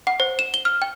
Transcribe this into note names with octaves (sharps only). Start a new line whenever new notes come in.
F#5
C5
E7
G7
F6
G5